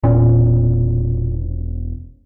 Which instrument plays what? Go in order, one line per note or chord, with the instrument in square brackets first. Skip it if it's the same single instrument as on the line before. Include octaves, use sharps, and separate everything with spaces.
[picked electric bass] E1 C#4 [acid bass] A#2